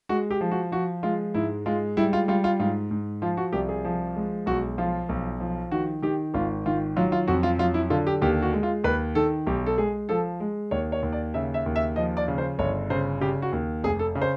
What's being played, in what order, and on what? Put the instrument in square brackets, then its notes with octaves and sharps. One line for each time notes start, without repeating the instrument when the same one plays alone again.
[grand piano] G#3 F#4
G4
F3
F#4
F3 F#4
G#3 F4
G#2 E4
G#3 F4
G3 E4
F4
G3 F4
F4
G#2 F4
G#2
F3 F4
F#4
C2 G4
G#4
F3
G#3
B1 F#4
F3 F4
B1
F3
D#3 F#4
D#3 G4
G#1 F4
D#3 F4
F#3 F4
F4
F2 F#4
F4
F#3 F4
E4
D3 F4
G4
D#2 G4
F#4
G#3
F4
D#2 B4
D#3 A4
B1 G4
A4
G#3 G#4
F3 A4
G#3
D#2 C#5
C#5
D#2
D5
C#3 E5
E5
D#2
E5
F3 D#5
D5
C#3
C5
G1 C#5
C#3 C5
C#3 G4
F#4
D#2
F1 G#4
A4
C#3
C5